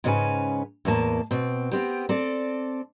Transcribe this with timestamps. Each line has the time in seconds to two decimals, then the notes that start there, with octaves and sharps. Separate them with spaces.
0.04 G#2 C#3 C#4 A4 B4 G#5
0.85 E2 A2 A#3 A5
1.31 B2 C4
1.71 B3 C4 G4
2.09 C4 A4 D5